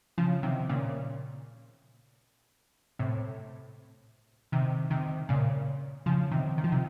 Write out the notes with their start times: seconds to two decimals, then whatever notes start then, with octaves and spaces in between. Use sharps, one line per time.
0.18 C#3 F3
0.43 C3 D#3
0.69 A#2 C#3
2.99 A2 C3
4.52 C3 D#3
4.90 C3 D#3
5.29 A#2 C#3
6.06 C#3 F3
6.31 C3 D#3
6.58 D#3
6.64 F3
6.72 C3 D#3